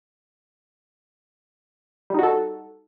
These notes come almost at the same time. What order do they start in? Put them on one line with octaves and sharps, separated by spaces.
G3 D#4 F#4 A4